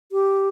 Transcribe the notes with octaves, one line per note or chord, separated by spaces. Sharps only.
G4